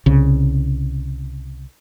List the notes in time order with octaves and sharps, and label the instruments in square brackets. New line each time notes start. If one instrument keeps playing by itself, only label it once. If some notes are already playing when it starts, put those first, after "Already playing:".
[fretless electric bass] C2 C#3